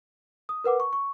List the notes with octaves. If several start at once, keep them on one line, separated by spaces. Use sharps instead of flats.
D#6
A#4 B4 F#5 D6
C#6
C#6